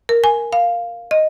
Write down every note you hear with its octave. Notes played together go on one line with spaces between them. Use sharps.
A#4
G#5
F5
D#5